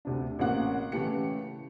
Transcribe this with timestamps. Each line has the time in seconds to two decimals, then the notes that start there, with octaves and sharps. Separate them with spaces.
0.05 D2 C3 D4
0.39 A1 C#3 A#3 C4 F#5 F#6
0.92 C#3 E3 A3 G4 C#7